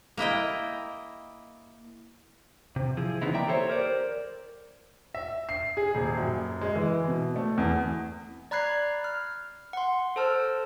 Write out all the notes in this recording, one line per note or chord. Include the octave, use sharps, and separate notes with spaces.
A#3 E4 D#5 G5
C3
F3 E4 G#4
C#3 E3 B3 C4 D#4 E4
A#3 D5 E5 G5 A#5
G4 A4 C5 C#5
A#4 C5 D5
E5
C7
G#4
D#1
F#2
G#3
E3
B2
A3
E2
D5 A#5 B5 F#6 G#6 C7
F6
F#5 C6
A4 C5 A5 E6 F6